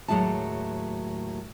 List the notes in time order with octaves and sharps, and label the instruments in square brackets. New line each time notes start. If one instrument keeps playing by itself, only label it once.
[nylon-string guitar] D#2 A2 F#3 G#3 E4 A5